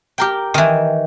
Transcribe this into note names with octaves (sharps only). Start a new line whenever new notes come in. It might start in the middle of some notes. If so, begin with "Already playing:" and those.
G4 A#4 G5
D#3 E3